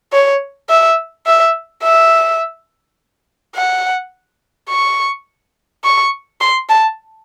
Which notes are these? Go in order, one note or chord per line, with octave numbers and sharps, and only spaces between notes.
C#5
E5
E5
E5
F#5
C#6
C#6
C6
A5